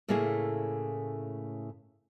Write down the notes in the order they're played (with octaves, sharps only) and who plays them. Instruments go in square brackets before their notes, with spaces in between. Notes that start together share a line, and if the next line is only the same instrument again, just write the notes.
[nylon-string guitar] A2 C#3 A3 A#3 E4 G#4